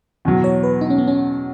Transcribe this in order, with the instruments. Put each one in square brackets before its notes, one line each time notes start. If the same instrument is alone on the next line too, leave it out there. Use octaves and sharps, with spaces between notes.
[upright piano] E2 B2 F#3
[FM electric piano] C#5
B4
D#4
C#4
B3
C#4